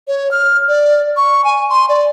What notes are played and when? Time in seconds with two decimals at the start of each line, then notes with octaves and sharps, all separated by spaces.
0.08 C#5
0.31 F6
0.68 D5
1.17 C#6
1.44 G#5
1.70 C6
1.89 D5